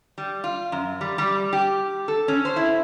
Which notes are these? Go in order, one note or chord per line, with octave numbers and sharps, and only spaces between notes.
G3
F4
F#2
G3
G3
G4
A4
C#4
C5
E4